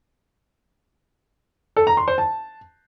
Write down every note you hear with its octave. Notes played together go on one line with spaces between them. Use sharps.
A4
A#5
C6
C5
A5